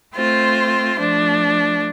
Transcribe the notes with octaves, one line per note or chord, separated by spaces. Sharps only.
A3 C4 F4 C5
F3 A3 D4